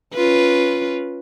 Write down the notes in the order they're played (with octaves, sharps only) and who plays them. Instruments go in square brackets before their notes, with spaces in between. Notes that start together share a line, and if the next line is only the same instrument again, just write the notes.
[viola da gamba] C#4 F4 B4